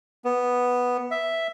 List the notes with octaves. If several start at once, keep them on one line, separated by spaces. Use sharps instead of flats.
B3
E5